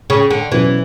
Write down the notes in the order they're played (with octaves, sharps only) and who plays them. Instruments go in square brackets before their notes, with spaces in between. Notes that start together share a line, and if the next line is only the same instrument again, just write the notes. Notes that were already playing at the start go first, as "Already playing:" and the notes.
[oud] C#3
D3
[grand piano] B2 F#3 C#4 [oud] E3